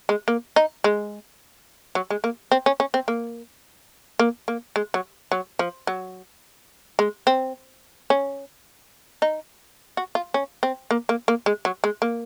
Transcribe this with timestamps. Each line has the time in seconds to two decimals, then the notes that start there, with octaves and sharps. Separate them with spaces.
0.09 G#3
0.28 A#3
0.56 D#4
0.84 G#3
1.95 F#3
2.10 G#3
2.24 A#3
2.52 C4
2.66 C#4
2.80 C#4
2.94 C4
3.08 A#3
4.19 A#3
4.48 A#3
4.76 G#3
4.94 F#3
5.32 F#3
5.59 F3
5.87 F#3
6.99 G#3
7.27 C4
8.10 C#4
9.22 D#4
9.97 F#4
10.15 F4
10.34 C#4
10.63 C4
10.91 A#3
11.09 A#3
11.28 A#3
11.46 G#3
11.65 F#3
11.84 G#3
12.02 A#3